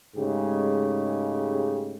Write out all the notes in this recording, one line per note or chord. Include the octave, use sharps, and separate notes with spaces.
G#2 C#3 G#3 A3 G4